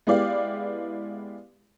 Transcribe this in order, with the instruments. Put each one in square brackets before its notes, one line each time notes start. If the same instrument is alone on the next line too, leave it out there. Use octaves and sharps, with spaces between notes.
[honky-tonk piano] G#3 B3 E4 G4 D5 F5